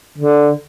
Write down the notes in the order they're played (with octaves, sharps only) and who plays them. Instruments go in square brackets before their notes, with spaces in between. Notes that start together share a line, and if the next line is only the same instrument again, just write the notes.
[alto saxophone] D3